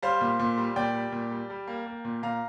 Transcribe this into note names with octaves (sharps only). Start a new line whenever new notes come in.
G3 C5 F5
A#2
A#2
G3
A#2 D5 G5
G3
A#2
G3
G3
A#3
A#3
A#2
A#2 F5 A#5